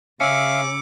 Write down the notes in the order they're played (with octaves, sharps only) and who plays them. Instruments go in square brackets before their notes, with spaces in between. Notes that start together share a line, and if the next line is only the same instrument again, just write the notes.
[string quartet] C#3 D6 [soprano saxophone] C#4 [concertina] E5 F5 [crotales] E6 C#7